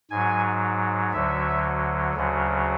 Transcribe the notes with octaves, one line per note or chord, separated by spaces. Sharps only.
G#2 F#3 G#5
D2 D3 F#3 E5
D2 C#3 F#3